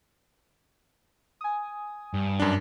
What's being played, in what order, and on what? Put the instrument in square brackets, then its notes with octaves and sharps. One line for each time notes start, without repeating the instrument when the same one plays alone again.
[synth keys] G#5 D#6
[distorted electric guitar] G2
[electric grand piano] F#2 D4